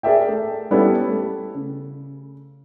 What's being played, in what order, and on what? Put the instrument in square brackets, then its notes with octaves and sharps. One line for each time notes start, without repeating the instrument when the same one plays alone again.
[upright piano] G#4 A#4 D5 E5 G5
A3
G3 B3 C#4 E4 G4 A4
A3
C#3